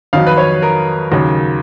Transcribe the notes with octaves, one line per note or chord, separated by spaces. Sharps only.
F2 D#3 F#3 F5
B4
C#5
A#4
D#2 C#3 F#3